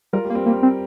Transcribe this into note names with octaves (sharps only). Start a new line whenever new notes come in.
G3 F4 A#4
G3
A#3
G3 C4
G3 A#3
C4